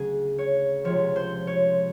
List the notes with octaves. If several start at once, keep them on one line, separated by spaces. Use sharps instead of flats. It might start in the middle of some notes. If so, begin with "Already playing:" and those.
Already playing: D2 C#3 F#3 G#4
C#5
C#2 C3 F3 C#5
C5
C#5